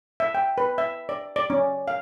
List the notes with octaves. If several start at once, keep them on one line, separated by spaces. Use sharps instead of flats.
E5
G5
B4
E5
D5
D5
C#4
F5